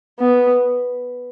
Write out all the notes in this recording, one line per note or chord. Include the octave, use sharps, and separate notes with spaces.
B3